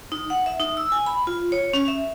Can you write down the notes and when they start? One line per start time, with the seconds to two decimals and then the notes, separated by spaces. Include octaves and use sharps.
0.12 D#4
0.30 F#5
0.46 E5
0.60 D#4
0.77 E6
0.92 G#5
1.06 B5
1.27 F4
1.52 C#5
1.73 C#4
1.88 E5